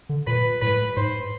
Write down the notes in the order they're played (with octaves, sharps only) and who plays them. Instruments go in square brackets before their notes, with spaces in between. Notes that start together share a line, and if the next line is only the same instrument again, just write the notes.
[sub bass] D3
[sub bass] A#2 [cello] B4
[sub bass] A2 [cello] B4
[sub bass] G#2 [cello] C5